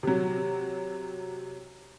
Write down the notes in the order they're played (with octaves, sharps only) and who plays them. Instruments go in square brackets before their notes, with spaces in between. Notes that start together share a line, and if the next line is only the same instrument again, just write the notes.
[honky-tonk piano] C3 F#3